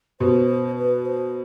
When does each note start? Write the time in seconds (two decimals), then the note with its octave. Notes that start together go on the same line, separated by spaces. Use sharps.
0.20 B2 C5
0.77 B4
1.05 C5